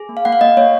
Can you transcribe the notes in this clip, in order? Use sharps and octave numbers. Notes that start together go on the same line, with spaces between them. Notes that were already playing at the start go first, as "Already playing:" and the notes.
Already playing: G#4
A#3
F5
A#3 F#5
F5
A#3 D#5
A#3 C#5